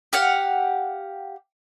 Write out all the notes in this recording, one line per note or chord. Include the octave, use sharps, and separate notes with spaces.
G4 F5 F#5